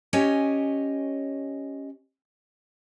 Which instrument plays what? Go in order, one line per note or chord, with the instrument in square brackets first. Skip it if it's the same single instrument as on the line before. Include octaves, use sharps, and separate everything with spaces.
[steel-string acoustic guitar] C#4 G4 C#5 D#5 G#5